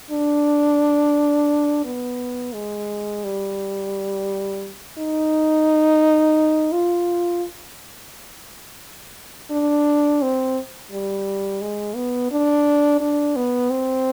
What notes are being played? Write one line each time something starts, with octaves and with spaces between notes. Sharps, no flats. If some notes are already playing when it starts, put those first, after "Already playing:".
D4
B3
G#3
G3
D#4
F4
D4
C4
G3
G#3
B3
D4
D4
B3
C4